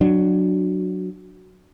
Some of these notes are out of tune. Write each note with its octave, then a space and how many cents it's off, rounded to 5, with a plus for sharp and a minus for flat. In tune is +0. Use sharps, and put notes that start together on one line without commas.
F#3 +0 D4 +15